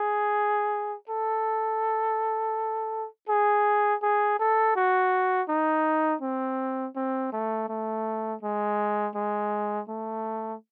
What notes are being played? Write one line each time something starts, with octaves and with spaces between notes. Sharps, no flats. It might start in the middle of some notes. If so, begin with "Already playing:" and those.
Already playing: G#4
A4
G#4
G#4
A4
F#4
D#4
C4
C4
A3
A3
G#3
G#3
A3